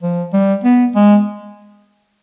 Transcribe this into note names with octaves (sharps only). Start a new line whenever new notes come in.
F3
G3
B3
G#3